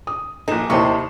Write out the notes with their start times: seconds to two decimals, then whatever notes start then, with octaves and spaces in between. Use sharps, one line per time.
0.07 D#6
0.48 A#1 D#4 G#4 A4 E7
0.70 D#2 C3 D#3 E4 C5 D#5 A5 C#6